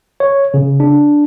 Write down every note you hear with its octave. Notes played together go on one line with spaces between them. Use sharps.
C#5
C#3
D4